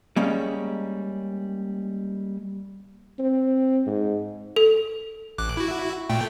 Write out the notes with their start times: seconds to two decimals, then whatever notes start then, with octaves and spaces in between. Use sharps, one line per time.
0.16 G3 G#3 A#3 C#4
3.19 C4
3.86 G#2
4.56 A4
5.38 A1 D6 F#6
5.57 E4 F#4
6.09 A#2 A3 G5